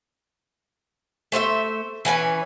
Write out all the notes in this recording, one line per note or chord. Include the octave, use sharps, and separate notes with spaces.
A3 C5 D#5 E5
E3 C#4 B4 G#5